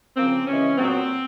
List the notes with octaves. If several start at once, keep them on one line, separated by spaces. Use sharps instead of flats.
C#3 F3 A#3 C4
C#3 E3 G#3 C#4
A#2 F#3 B3 C4